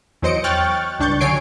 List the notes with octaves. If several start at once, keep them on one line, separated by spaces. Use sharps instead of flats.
E2 F#3 C5 D#5 C#7 D7
G5 C#6 F6 F#6 A6
C#2 G2 D4 C#6 G6 A6
D3 F#3 C#5 G#5 C7 D7